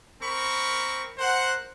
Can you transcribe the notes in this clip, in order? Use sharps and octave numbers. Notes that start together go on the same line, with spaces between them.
C4 A#4 B5 C#6
A#4 C5 F#5